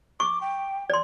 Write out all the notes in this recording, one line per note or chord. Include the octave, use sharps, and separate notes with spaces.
C#6 D6
G5
D5 C6